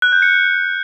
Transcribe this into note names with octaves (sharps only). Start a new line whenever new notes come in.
F#6
G6
C#7